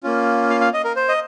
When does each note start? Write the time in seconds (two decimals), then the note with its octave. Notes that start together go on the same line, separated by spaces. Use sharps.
0.03 A#3 C#4 F4
0.50 F5
0.61 F5
0.74 D#5
0.84 A#4
0.96 C5
1.09 D#5